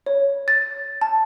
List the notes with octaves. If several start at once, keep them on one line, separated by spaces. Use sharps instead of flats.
C#5
A6
A5